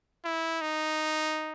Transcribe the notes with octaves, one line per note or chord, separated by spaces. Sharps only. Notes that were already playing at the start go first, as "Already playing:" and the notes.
E4
D#4